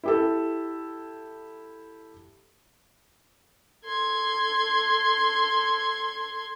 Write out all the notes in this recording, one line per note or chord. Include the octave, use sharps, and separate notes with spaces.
E4 G4 A4
A4 C6 G#6